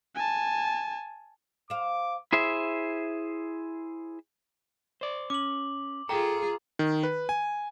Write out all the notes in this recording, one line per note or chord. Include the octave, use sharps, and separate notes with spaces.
G#5 A5
C5 F5 D6
E4 G#4 C5 E5
C5 D5
C#4 D6 F#7
F4 G#4 A4 G5 A#5
D#3
B4
G#5